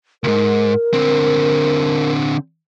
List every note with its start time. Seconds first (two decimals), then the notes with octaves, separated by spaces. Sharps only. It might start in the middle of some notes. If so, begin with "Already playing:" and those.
0.24 C#2 G#2 A#4
0.94 D3 C4